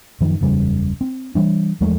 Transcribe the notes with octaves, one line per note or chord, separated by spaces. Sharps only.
F#2 D#3 F3
F#1 E2 C#3 G3
C4
E3 G3 D4
E2 F3 G#3 A3